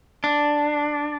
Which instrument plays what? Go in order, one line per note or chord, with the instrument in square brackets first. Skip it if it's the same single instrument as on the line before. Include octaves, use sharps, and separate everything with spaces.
[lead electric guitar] D4